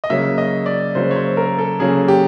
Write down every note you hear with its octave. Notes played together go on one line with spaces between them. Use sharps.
D#5
C#3 F#3 A#3 C#4 E5
D#5
D5
C#3 F#3 A#3 C#4 C5
C#5
C5
A#4
A4
C#3 F#3 A#3 C#4 G#4
G4